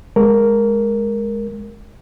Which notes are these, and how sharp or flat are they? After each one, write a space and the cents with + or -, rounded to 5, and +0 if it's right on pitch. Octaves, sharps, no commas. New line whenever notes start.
G#3 +0 A#4 +0